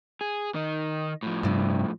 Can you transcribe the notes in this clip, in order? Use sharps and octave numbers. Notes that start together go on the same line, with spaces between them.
G#4
D#3 D#4
A2 F3
G2 C3